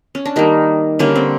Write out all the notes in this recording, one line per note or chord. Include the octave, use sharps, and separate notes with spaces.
C#4
D4
D#3 G3 A#3 D#4
D3 G3 A#3 C#4
C4